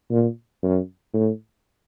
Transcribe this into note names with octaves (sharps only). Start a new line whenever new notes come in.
A#2
F#2
A2